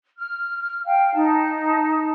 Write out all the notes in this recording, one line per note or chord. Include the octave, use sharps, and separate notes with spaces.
F6
F5 G5
D#4 A5